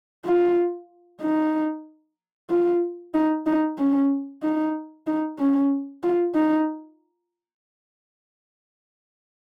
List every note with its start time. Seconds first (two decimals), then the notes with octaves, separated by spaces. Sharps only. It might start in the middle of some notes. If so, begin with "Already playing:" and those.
0.25 F4
1.21 D#4
2.49 F4
3.14 D#4
3.46 D#4
3.78 C#4
4.43 D#4
5.07 D#4
5.39 C#4
6.03 F4
6.35 D#4